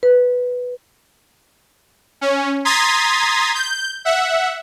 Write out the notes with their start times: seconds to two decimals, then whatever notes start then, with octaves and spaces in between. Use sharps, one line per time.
0.03 B4
2.21 C#4
2.65 A#5 C6 D#6 G#6 A6 B6
3.54 G6
4.05 E5 F#5